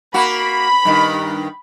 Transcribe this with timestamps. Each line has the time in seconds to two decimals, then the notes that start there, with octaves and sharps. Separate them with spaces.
0.14 A#3 F#4 B5
0.85 G2 D#3